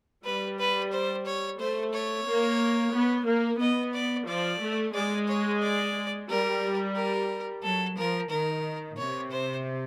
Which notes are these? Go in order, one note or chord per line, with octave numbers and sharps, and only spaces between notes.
G3 B4
B4
C5
C#5
A3 C5
C#5
A#3
B3
A#3
B3 D#5
D5
F3 D5
A3
G#3 D5
C#5
D5
G3 A#4
A#4
F#3 A4
F3 A#4
D#3 A#4
C3 C#5
C5